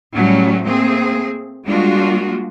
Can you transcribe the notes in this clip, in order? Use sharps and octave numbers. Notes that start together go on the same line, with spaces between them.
A2 F#3 G3 A3 C#4
A3 A#3 C4 G#4
G3 G#3 A#3 D4 F4 F#4